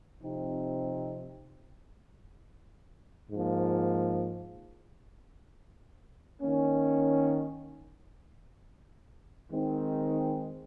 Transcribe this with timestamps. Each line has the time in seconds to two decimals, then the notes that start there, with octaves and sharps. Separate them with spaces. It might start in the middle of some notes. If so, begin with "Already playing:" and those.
0.22 C3 F3 C4 D#4
3.31 G#2 F3 A#3
6.42 D#3 A#3 C#4
9.51 D#3 G#3 C4 D#4